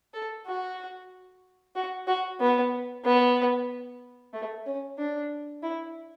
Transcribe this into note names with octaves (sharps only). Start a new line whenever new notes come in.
A4
F#4
F#4
F#4
B3
B3
A3
C#4
D4
E4